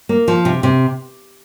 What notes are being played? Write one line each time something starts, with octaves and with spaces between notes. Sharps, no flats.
A#3
F3
C3
C3